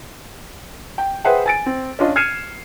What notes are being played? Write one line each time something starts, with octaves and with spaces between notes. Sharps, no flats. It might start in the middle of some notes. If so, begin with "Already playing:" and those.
G5
G#4 B4 C5 E5 F#5 G5
G#5 A6 D7
C4
C#4 D4 F4 D#5
F6 G#6 C7 C#7 D#7 E7